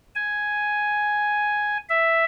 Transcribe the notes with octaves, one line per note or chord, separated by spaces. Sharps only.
G#5
E5